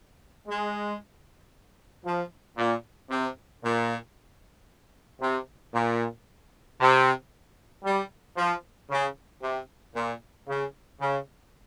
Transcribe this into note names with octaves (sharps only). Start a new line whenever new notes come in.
G#3
F3
A#2
C3
A#2
C3
A#2
C3
G3
F3
C#3
C3
A#2
C#3
C#3